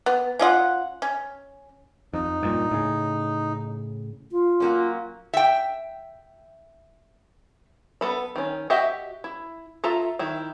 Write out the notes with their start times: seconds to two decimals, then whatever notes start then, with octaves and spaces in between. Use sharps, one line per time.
0.06 B3
0.39 C#4 F4 D#5 F#5
1.02 C#4
2.14 F2 D#4
2.43 G2 A#2
2.71 A2 C#3
4.32 F4
4.60 F#3 A#3 C#4
5.34 E5 G5
8.01 B3 A4 B5
8.36 D#3 C#4
8.70 F#4 G4 D#5 E5
9.24 E4
9.84 F4 A4 E5 A#5
10.19 D#3 E4